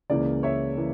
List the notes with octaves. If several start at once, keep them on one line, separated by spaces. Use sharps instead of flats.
C#2 C#3 E3 A#3 D5
C#5 E5
C#3 E3 A#3